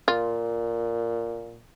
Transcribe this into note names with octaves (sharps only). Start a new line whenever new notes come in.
A#2 F4